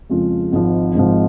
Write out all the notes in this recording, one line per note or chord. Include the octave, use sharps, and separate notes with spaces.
F2 C#3 F3 G#3 F4
G#1 G#2 F3
G#1 G#2 F3